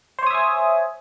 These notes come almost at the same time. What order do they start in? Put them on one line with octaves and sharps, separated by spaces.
C5 C#5 D#6 E5 G#5